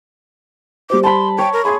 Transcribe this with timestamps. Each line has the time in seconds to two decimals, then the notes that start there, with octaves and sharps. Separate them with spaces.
0.90 G3 G4 C5 D6
1.03 A5 B5 C6
1.38 C#5 G5
1.53 A#4
1.65 G#4 B5 C6 G#6